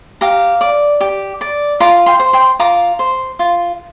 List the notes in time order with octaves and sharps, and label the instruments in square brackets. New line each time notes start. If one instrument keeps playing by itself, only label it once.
[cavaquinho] G4 F5 A#5
D5
G4
D5
F4 A#5 D6
G5 C6
C5
G5 C6
F4 A#5 D6
C5
F4